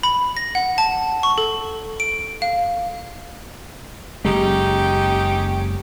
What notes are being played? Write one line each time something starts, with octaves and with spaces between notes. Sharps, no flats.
B5
A#6
F#5
A5
C#6
A4
D7
F5
F#1 G#3 C#4 D#4 G4